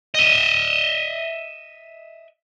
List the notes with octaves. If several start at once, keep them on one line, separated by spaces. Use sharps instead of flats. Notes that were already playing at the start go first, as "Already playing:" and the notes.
D#5 E5